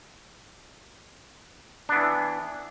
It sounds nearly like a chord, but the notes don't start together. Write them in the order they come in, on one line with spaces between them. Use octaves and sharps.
D4 B3 E3